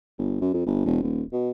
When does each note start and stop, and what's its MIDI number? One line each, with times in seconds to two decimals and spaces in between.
0.18 0.41 31
0.41 0.53 42
0.54 0.66 41
0.66 0.83 31
0.86 1.02 28
1.03 1.22 27
1.33 1.51 47